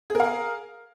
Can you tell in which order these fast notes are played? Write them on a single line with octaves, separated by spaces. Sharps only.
G#4 A#4 F5